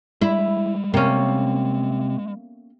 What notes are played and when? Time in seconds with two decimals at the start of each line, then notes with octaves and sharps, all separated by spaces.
0.21 G3 G#3 E4
0.94 C3 A#3 C#4